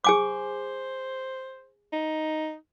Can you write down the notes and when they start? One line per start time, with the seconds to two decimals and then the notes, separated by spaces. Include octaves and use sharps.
0.04 G#4 C5 G#5 D6
1.92 D#4